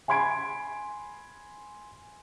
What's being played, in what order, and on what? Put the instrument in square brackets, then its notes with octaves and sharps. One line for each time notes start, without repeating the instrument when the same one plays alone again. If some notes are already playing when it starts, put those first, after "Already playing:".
[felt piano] G#5 B5 C6 G#6 D7